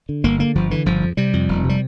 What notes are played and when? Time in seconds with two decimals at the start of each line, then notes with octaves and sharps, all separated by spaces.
0.09 D3
0.24 G1 A#3
0.39 D3 A#3
0.55 G1 F3
0.71 D3 E3
0.86 G1 F3
1.02 F2
1.17 C3 G3
1.33 F2
1.49 F1
1.64 C3
1.69 G3